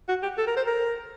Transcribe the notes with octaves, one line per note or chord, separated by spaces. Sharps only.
F#4
G4
A4
A#4
C5
A#4